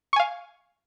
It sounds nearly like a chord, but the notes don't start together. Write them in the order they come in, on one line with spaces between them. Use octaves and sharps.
C#6 G#5 F5